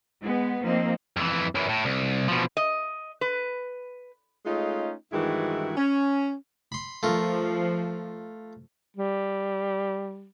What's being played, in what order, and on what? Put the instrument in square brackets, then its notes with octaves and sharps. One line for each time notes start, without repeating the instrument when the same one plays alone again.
[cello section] G#3 B3
F3 A#3 C4 D#4
[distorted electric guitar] F2 E3
F#2 E3
A2
C2
B2 F3
[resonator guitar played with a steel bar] D#5
B4
[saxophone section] G#3 A3 C#4 D#4 F4
G2 D#3 E3 G#3 E4 F#4
C#4
[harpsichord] B5 C6
[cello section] F3 [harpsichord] A3 F4 A#4
[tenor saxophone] G3